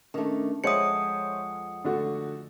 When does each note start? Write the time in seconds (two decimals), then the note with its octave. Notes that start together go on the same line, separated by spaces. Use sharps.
0.14 D#3 A3 C#4 D4
0.64 F2 G#3 C5 C#5 E5 F#5 D#6 C#7
1.84 D3 A3 F#4